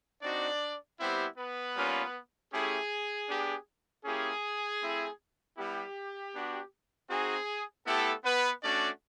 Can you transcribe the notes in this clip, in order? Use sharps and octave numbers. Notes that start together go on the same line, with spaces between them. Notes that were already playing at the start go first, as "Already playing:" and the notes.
C4 D4 D#4 F#4 D5
G3 B3 C4 E4 G4 C5
B3 B4
G3 A#3 C#4 F4
A3 C#4 E4 G4 G#4
B3 D4 G4
A#3 C#4 E4 G4 G#4
A3 C4 E4
G3 B3 E4 G4
B3 D4 F#4
C4 D#4 F#4 G#4
A3 B3 E4 G4 A4
B3 B4
A3 C#4 D4 F#4 D5